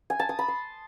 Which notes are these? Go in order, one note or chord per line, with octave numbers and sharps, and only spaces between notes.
G#5
A5
D#6
B5
C6